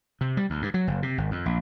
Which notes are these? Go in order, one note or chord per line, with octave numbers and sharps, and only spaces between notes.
C3
G3
D2
G2
F#3
F#1
C3
G#1
F2
A#1